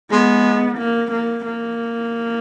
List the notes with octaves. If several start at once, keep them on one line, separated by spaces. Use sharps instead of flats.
G#3 B3
A#3
A#3
A#3